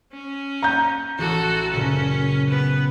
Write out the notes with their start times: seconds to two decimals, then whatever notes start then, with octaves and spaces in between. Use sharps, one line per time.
0.13 C#4
0.63 F#5 A#5 G6
1.18 A1 F#4 A4
1.72 F#1 A#2 C#3 C#4
2.48 B3 B4